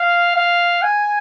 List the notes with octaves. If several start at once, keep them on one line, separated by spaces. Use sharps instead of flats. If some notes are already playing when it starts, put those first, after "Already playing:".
Already playing: F5
F5
G#5